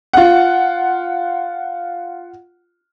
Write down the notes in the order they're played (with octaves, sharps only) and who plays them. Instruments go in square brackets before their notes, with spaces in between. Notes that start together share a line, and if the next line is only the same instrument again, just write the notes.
[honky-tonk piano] F4 F#5